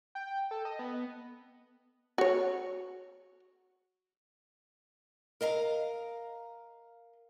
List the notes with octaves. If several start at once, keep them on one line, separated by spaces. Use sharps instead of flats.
G5
A4
D#5
B3
F#4 C#5
A#4 D#5 F5 A#5